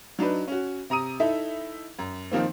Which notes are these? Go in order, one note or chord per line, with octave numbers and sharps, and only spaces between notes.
F#3 D4 D#4 B4
C#4 F#4
C3 A#5 D#6 D#7
D#4 E4 A4 E5
F#2
D#3 F3 A#3 C4